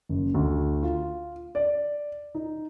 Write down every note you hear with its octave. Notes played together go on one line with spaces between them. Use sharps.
F#1
D2
F4
D5
D#4